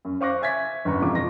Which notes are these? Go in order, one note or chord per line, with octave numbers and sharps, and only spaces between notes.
F#2
C5 F5 C#6 D6 F#6 A#6
E5 G#5 G#6 A6 B6
G1 F#2 B4 A#5 C#6
E1 F2 F4 D6
F4 A#6